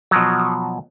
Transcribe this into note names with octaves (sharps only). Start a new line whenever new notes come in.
B2 F3 F#3